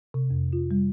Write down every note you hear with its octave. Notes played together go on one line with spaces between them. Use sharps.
C3
F2
F4
G3